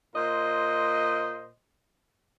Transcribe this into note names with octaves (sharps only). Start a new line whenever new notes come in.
A#2 C5 D#5